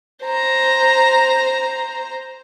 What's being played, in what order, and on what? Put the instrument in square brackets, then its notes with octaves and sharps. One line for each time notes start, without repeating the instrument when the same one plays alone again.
[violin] C5 A#5